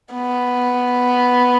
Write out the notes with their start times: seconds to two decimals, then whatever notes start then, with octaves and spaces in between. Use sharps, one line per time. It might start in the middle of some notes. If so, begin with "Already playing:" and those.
0.14 B3